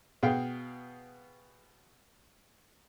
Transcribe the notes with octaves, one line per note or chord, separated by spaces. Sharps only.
B2 B3 G#4 F5 G5